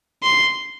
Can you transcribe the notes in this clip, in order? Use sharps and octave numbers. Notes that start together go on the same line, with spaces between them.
C6